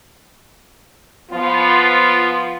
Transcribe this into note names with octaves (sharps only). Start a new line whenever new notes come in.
F3 B3 F4